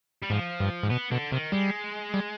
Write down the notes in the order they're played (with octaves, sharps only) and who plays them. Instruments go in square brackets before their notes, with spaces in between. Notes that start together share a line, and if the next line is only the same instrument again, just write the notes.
[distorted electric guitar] G3
[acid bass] G#2 [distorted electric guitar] F3
[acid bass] G2
G#2
[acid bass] B2 [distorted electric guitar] B3
[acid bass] B2 [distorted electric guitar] D3
[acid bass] C3 [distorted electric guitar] D#3
[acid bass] G3 [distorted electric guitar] G#3
[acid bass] G3